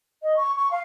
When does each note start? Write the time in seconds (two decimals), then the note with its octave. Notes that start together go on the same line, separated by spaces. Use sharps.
0.22 D#5
0.36 C#6
0.56 C#6
0.71 F5